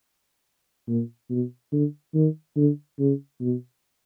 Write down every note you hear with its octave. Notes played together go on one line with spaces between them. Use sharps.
A#2
B2
D3
D#3
D3
C#3
B2